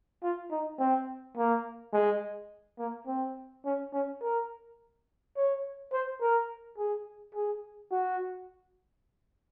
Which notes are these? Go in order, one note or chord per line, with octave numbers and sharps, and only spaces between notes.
F4
D#4
C4
A#3
G#3
A#3
C4
C#4
C#4
A#4
C#5
C5
A#4
G#4
G#4
F#4